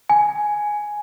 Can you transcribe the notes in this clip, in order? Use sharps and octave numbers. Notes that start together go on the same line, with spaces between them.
G#5